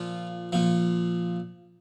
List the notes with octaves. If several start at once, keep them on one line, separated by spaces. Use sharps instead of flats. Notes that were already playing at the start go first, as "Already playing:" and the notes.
Already playing: A#2 F3 F4
A#2 F3